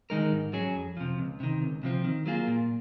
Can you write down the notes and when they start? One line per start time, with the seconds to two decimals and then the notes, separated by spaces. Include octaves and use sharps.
0.10 D#3 G#3 D#4 A#4
0.32 G#2
0.53 F#3 C#4 G#4
0.75 F2
0.97 C3 F3
1.18 C#2
1.40 C3 D#3
1.62 C#2
1.83 C3 F3 C4
2.04 D#3
2.26 F#3 A#3 F4 G#4
2.47 A#2